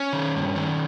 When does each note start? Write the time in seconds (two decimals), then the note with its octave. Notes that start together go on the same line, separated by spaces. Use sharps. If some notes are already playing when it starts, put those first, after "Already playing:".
Already playing: C#4
0.13 D#3
0.35 G2
0.56 D#3